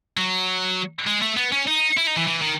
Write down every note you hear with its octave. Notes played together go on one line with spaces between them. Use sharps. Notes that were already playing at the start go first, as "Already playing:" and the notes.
F#3
G#3
A3
B3
C#4
D#4
E4
D#4
E3
E3
D#3